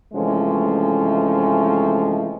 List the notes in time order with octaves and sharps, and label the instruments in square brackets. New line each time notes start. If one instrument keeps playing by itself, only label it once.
[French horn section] C3 E3 F3 G#3 A3 C#4